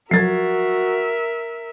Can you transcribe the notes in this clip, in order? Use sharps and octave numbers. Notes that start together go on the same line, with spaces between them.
F3 F#3 F#4 A#4 E5 G#6 A6 C7